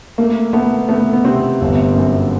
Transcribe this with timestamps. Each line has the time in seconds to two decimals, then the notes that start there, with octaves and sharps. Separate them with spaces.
0.18 A3 A#3
0.53 A3 B3
0.89 A3 B3
1.13 B3
1.24 C3 C4
1.61 G1
1.96 F#2